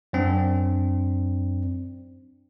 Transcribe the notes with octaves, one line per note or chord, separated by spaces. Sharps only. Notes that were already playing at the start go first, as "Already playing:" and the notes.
F#2 C4 D4